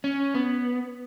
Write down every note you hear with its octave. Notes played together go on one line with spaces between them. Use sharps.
C#4
B3